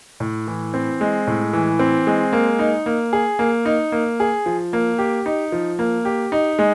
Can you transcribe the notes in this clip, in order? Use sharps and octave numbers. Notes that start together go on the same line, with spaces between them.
A2
E3
C4
G#3
A2
E3
C4
G#3
A#3
D#4
A#3
G#4
A#3
D#4
A#3
G#4
F3
A#3
G4
D#4
F3
A#3
G4
D#4
G#3